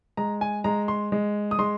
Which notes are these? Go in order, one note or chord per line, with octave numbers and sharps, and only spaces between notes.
G#3 A#5
G#5
G#3 A#5
C6
G#3
D#6
G#3 C6